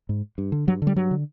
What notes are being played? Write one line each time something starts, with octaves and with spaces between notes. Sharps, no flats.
G#2
G2
D3
G2 F#3
D3
G3
G2 F#3
D3